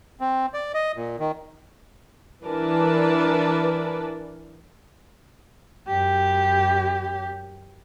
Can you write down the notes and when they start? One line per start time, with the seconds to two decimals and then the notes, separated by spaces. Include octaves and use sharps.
0.20 C4
0.54 D5
0.74 D#5
0.97 A#2
1.19 D#3
2.45 E3 D4 A#4 B4 D5 A5
5.87 F#2 G4